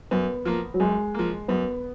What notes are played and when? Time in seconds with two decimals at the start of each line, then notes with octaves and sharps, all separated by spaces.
0.11 F#2 B3
0.45 F3 A#3
0.74 F#3
0.80 F#2 G#3
1.14 F3 A#3
1.48 F#2 B3